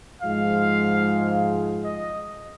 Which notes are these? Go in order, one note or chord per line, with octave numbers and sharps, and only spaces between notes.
G#2 F3 G#3 F5
D#5